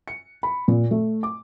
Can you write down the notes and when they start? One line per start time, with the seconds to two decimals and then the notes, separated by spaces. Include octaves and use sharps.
0.08 C#7
0.43 B5
0.68 A#2
0.91 A3
1.23 D6